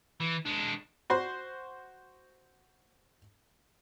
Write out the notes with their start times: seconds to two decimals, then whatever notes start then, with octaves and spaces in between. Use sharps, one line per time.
0.20 E3
0.46 G#3 D4
1.10 F#4 C5 C6